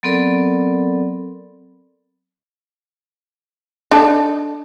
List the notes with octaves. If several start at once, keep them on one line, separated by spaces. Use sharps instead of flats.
F#3 B3 C4 A4 A#4 D5
D4 D#4 A4